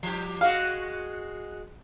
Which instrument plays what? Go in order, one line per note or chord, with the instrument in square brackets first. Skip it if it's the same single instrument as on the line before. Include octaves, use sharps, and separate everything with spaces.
[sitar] F3 G4
[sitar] G#3 F#4 [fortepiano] F5